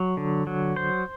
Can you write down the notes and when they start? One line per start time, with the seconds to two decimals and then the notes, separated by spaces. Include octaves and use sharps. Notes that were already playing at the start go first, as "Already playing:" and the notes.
Already playing: F#3
0.17 D3
0.47 F#3
0.76 C5